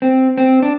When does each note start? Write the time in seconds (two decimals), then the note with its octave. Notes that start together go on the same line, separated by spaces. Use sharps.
0.02 C4
0.37 C4
0.62 D4